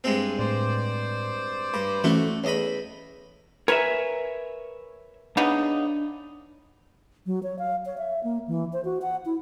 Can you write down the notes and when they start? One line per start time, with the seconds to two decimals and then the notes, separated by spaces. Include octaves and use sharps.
0.04 G2 G#3 C4
0.39 A2 C5 D5
1.74 G2 B5 D6
2.04 E3 A3 C#4 F#4 A4
2.44 E2 C#5 D#5 B5
3.68 A#4 B4 C#5 E5 G#5
5.37 C#3 B3 D4 D#4
7.26 F#3
7.43 C#5
7.59 F5
7.86 C#5
7.98 E5
8.24 A#3
8.48 E3
8.73 C5
8.85 F#4
9.02 F#5
9.26 E4